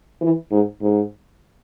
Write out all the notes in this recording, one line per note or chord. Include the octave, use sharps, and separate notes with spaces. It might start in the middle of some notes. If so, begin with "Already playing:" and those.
E3
G#2
G#2